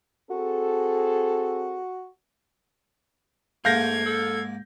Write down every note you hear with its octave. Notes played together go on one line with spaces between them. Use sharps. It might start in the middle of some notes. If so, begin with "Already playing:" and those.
C4 F#4 G#4 A4
G#2 A3 A#3 F5 G6 G#6 A#6
A4